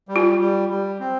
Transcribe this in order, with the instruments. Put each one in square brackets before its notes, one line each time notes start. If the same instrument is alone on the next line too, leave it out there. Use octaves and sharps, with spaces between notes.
[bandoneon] G3
[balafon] F4
[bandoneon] G3
G3
C4